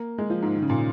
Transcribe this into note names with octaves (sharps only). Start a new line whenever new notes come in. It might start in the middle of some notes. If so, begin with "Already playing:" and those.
Already playing: A#3
G#3
F3
G#2
D#3
C#3
A#2
C#3